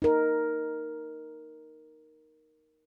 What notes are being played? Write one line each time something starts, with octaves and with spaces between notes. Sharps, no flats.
D#4 A#4